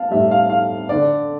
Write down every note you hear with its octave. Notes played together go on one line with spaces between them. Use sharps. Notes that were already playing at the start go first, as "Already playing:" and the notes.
Already playing: F5 A5
A2 G3 E5
F5
F5
D3 D5